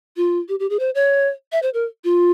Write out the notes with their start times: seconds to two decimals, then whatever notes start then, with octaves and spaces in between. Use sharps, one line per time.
0.17 F4
0.49 G4
0.60 G4
0.70 G#4
0.79 C5
0.95 C#5
1.52 E5
1.63 C5
1.74 A#4
2.04 F4